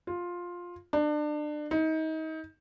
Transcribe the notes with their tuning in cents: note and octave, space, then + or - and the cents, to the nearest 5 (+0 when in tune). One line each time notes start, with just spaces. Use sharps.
F4 +10
D4 +30
D#4 +30